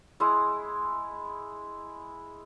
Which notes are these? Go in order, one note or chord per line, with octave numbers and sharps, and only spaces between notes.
G#3 E4